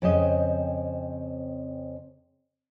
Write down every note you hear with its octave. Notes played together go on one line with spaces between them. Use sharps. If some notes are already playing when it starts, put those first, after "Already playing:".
F2 C#3 C4 D#5